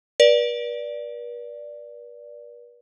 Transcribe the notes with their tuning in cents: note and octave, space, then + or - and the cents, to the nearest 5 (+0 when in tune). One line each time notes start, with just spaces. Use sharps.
B4 -45 D5 +0